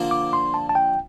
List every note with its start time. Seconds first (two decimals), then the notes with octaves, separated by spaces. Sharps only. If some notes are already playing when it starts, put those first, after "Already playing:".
Already playing: D3 F3 A#3
0.11 D6
0.33 C6
0.54 A5
0.69 A5
0.75 G5